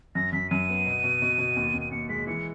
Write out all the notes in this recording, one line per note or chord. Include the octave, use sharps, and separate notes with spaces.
F#2 A#6
F#2 B6
F#2 D#7
B3
B2
B2
B2
B2
D#2
D#2
D#7
D#2 C#7
G#3 B6
E3 C#7